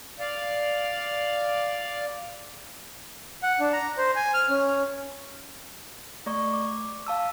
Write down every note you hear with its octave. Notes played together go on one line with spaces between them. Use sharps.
D5 F5
F#5
D4
A#5
C5
G#5
F6
C#4
A3 D5 C#6
D6
F5 A5 E6